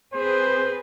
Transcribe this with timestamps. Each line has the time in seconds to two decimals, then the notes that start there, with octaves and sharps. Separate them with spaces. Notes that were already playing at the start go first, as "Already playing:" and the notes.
0.14 C4 G#4 B4 C5